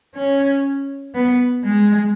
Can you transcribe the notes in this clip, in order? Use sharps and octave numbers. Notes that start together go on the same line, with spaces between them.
C#4
B3
G#3